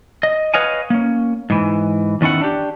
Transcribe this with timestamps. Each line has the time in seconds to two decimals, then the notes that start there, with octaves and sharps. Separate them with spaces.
0.23 D#5
0.54 B4 C#5 D#5 F5 F#5 G#5
0.90 A#3 C#4
1.50 G#2 E3
2.21 E2 D#3 C#4 E4 F#5
2.42 D4 G4